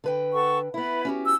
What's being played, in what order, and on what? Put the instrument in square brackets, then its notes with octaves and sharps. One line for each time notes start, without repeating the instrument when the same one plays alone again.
[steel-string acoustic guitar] D3 B4 G5
[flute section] A4 F#5 C#6
[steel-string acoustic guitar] B3 E4 [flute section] B4 B5
[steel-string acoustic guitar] C#4 F#4 G4
[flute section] E6